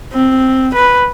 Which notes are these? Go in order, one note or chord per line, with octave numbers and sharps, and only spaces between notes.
C4
B4